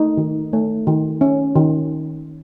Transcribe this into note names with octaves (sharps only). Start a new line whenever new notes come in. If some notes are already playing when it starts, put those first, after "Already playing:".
Already playing: A3 D#4
D#3
A3
D#3
C#4
D#3